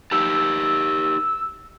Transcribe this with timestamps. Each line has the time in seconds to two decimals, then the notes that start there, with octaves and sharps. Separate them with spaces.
0.12 D#4 G4 A5 E6